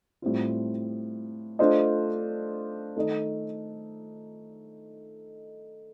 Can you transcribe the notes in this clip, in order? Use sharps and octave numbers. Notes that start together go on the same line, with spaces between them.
A2 G3 C4 F4
A3 D4 F4 C5 D#5
D#3 A3 D#4 A4 D#5